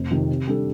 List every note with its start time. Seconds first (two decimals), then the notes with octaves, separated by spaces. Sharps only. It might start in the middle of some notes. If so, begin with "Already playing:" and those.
Already playing: F1
0.11 F2 C3 D#3
0.30 C3
0.47 G3 D4 A4